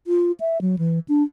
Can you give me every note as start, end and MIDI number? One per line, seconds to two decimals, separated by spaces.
0.07 0.32 65
0.40 0.61 76
0.61 0.76 54
0.78 0.99 52
1.08 1.23 62